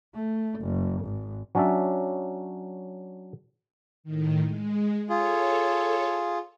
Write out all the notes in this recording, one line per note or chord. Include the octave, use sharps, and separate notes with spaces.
A3
F#1
G#1
F#3 C#4 D4 D5 E5
A2 D#3
G#3
F4 G#4 A4 C#5